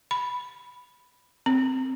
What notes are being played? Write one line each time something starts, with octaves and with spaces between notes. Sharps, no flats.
B5
C4